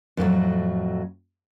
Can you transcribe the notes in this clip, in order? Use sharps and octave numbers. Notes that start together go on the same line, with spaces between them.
F2 A2 D#3 F#3